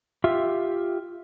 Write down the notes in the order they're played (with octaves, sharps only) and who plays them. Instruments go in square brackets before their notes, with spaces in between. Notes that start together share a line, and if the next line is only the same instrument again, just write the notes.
[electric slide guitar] F4 G4 E5